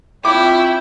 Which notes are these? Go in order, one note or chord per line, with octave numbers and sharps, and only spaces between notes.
C4 E4 F4 C#5 E5 F5 G5 D6